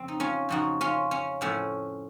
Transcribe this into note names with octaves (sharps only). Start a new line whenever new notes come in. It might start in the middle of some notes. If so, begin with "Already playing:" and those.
Already playing: F2 C#3 F3 C4
D#4
C#4 F4
F2 C#3 F3 D#4 F#4
C#4 F4
C#4
A2 F3 A3 C#4